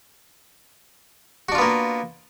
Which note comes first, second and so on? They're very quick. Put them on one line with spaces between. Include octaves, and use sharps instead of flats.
F#4 D4 F4 B3 A#3